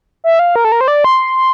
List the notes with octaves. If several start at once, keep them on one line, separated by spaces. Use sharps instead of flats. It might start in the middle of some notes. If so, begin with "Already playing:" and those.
E5
F5
A#4
A4
A#4
C5
D5
C6